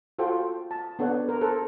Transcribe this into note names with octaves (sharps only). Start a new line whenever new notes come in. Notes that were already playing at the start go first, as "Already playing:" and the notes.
F4 F#4 A4 C5 G5
A5
B3 D4 A4 C#5 F#5
A#4
A4 C5